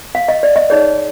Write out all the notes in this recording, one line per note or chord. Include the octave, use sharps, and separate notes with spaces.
F5
D#5
D5
D#5
D#4 G#4 C#5 D5